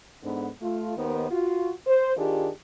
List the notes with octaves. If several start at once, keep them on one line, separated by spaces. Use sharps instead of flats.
G#2 D3 B3
A3 F4
D#2 D#3 B3 C5
F4 F#4
C5
D#3 D4 F4 G4 G#4